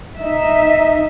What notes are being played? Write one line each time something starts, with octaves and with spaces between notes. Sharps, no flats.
D#4 E5